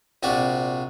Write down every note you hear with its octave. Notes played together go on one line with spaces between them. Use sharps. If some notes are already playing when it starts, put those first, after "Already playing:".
A#1 C3 F#4 D5